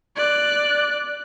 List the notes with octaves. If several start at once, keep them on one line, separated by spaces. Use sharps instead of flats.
D5 F#6